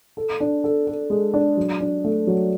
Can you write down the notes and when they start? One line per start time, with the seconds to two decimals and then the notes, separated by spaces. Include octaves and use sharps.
0.17 A4
0.40 D4
0.64 A4
0.87 A4
1.10 G#3
1.34 D4
1.57 F#3
1.80 D4
2.04 A3
2.27 F#3